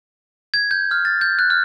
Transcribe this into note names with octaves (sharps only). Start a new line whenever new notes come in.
G#6
G6
F6
A6
G6
F#6
F6